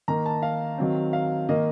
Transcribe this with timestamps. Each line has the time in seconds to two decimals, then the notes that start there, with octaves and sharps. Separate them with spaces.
0.08 D#3 A#3 A#5
0.26 A5
0.42 F5
0.78 D#3 F#3 C4
1.13 F5
1.49 D#3 A#3 D#5